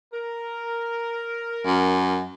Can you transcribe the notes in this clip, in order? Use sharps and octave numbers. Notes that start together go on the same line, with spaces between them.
A#4
F#2